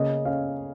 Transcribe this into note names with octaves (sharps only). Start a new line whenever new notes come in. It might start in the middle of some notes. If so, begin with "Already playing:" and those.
Already playing: C#3 A#3 D#5
C#4 F5